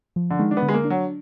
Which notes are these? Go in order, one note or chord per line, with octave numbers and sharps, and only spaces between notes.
F3
D3
D#3 G#3
D4
B3
D3
G#3
A#3
D4
F#3